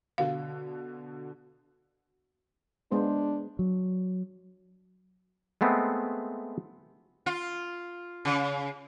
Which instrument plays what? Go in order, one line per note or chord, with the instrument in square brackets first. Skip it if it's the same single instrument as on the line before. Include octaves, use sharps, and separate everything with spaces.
[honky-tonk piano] B2 D3 [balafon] F5
[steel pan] G#3 B3 C5 [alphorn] D4
[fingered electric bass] F#3
[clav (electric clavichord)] G#3 A3 B3 C4
[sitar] F4
C#3